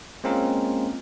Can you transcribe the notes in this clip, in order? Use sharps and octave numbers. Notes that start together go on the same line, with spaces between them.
G#3 A#3 C4 C#4 F4 A#4